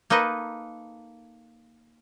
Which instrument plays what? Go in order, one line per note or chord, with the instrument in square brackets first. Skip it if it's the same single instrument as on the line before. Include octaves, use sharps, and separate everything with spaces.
[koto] A#3 D#4 A4 B4 D#5